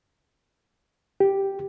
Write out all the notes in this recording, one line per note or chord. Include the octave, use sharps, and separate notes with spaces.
G4